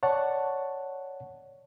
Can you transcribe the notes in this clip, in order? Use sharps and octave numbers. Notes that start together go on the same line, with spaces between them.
C#5 D5 F#5 A5 C#6